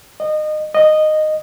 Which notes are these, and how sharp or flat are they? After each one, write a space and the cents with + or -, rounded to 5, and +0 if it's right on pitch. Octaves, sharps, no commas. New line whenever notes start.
D#5 -25
D#5 -10